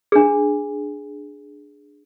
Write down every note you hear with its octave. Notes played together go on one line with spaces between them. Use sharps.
D4 G#4